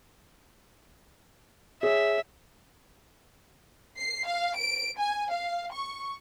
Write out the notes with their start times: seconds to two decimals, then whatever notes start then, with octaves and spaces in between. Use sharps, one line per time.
1.83 G#4 C#5 E5
3.98 C7
4.27 F5
4.56 D7
4.98 G#5
5.31 F5
5.72 C#6